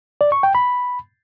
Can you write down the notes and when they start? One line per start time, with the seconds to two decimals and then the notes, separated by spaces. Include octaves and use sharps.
0.21 D5
0.32 C#6
0.43 G5
0.55 B5